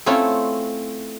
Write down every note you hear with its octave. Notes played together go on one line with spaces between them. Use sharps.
A3 C4 C#4 E4 F4 C#5